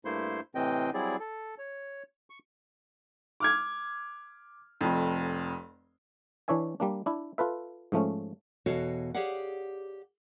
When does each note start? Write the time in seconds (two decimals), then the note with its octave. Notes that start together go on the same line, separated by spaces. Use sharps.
0.05 G2 A3 A#3 E4 C5 C6
0.55 A2 C3 E3 C4 D#5 G5
0.94 F#3 G3 C4 E4 G#4 D5
1.20 A4
1.58 C#5
2.30 C#6
3.40 D6 F6 G#6
4.81 F1 F2
6.48 E3 D4 C#5 E5 G#5
6.80 G3 A#3 D4
7.06 D4 E4
7.38 F4 A4 B4 E5
7.92 G#2 F3 A3 C#4
8.66 E2 B2 F#4 A4 C#5 F5
9.15 G4 G#4 C#5 D5 F5 F#5